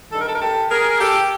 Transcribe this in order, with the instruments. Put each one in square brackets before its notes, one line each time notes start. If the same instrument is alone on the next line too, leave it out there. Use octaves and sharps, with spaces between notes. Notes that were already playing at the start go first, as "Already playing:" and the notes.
[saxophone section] G2 D#3 A4
A#4
A4
A#4
G4 A4
G#4 A#4
G4 A4